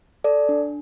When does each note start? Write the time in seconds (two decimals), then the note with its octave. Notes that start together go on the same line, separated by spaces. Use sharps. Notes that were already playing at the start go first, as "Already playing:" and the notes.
0.24 A4 D5
0.49 D4